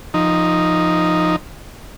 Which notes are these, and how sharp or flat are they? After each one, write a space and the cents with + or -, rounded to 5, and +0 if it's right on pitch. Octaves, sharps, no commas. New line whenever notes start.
F3 +0 D#4 +0